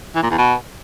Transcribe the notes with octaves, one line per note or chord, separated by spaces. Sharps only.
E3
A#2
E2
B2